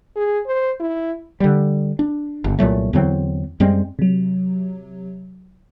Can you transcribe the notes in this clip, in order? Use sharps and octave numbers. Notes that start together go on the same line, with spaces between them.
G#4
C5
E4
D3 G3
D4
G1
C2 A#2 F#3 A3
E2 D3 F#3 C4
F#2 G3 G#3 C4
C3 F#3